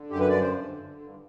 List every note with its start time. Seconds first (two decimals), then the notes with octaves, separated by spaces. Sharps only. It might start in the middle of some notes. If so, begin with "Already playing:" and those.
Already playing: D3
0.10 F#2 G4
0.20 B4
0.28 G2 D5
0.41 C5
0.48 G2
0.65 D3
0.83 D3
1.01 G2